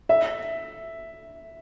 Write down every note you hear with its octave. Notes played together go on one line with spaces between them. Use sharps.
E5